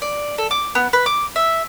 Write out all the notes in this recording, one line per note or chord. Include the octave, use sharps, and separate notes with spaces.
D5
A4
D6
B3
B4
D6
E5